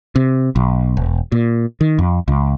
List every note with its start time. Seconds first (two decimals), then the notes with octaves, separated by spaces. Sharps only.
0.16 C3
0.56 B1
0.97 E1
1.32 A#2
1.81 D#3
1.99 F2
2.28 C#2